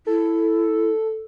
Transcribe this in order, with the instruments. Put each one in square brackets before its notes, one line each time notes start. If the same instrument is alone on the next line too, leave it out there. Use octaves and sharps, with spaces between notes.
[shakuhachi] E4 [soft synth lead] A4